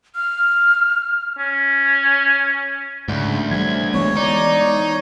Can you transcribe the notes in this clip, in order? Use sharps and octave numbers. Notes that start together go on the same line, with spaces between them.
F6
C#4
D2 G#2 C#3
E3 F3 G3 G#6
E3 G#3 B3 C#5
D#4 D5